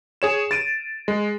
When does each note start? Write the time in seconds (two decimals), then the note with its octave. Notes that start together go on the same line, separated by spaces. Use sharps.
0.22 G#4 C#5 E7
0.51 A6 D7 D#7
1.08 G#3